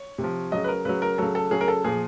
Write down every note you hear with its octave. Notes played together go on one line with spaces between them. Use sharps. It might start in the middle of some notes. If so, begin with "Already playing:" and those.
Already playing: C#5
C3
F3
C#3 F#3 D#5
B4
A#4
C#3 F#3 B4
A#4
C#3 F#3 A4
A4
C#3 F#3 G#4
A#4
A4
A#2 F3 G#4